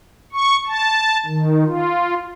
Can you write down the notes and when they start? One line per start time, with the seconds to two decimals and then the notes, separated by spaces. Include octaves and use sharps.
0.33 C#6
0.67 A5
1.26 D#3
1.65 F4